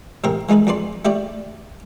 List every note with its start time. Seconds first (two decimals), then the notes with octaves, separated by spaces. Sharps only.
0.24 A1 C3 C4 A4 A#4
0.49 E3 G#3 D#4 A4 B4
0.67 F2 D4 B4 D5 C6
1.05 A3 E4 G4 D5 E5